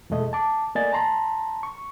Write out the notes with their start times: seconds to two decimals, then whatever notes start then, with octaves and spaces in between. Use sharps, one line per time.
0.10 E2 B2 G#3 A3 D#5
0.33 A5 D6
0.75 A3 A#3 D5 D#5 G#5 A6
0.93 A5 A#5 C6
1.63 C#6